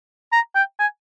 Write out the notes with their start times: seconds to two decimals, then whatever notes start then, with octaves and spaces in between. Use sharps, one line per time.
0.33 A#5
0.55 G5
0.79 G#5